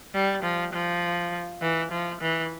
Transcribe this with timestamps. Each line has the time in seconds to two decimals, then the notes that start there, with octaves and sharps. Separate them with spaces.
0.14 G3
0.44 F3
0.73 F3
1.62 E3
1.91 F3
2.21 E3